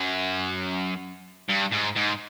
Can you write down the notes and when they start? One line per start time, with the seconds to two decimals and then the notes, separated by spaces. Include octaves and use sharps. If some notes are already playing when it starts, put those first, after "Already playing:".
Already playing: F#2
1.49 G2
1.72 G#2
1.96 G#2